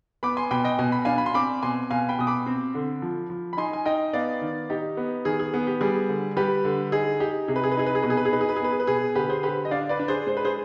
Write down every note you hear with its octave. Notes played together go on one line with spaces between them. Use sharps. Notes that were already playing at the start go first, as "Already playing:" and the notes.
B3 B5 D6
G#5 C6
B2 G5 B5
D#5 G5
B2 G#5
B5
D4 F5 G#5
B5
C6
C4 B5 D6
B2 G#5 C6
B2 F5 G#5
G5 B5
B2 D#6
B5 D6
C4
D3
F3
F3
B5
D#4 G#5 C6
G#5
D#4 D#5 G5
B3 D5 F5
D#3
D#4 G4
B3
D#3 G#4
G#4
B3
G4
G3 G#4
D3
G3 G4 B4
D3
D#4 G#4
D#4 G4
C3 G#4
B4
G#4
B4
D#4 G#4
B4
G#4
B2 B4
G#4
B4
G#4
D#4 B4
G#4
B4
G#4
B3 B4
G#4
B4
B2 G#4
D3 G4 B4
G#4 C5
D3 G4 B4
D#5
D4 D5 F5
B4 D5
D4
G#4 C5
G#3 C5
B4
G#4 C5